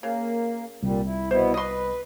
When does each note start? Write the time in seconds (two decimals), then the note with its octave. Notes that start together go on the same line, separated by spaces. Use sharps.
0.03 C#3 A#3
0.83 C2 A#2 G3
1.06 E4
1.31 B2 B3 E4 C5
1.54 B4 D#5 C6